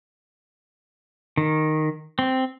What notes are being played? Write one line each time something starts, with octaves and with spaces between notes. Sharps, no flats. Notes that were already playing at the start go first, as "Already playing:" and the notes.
D#3
C4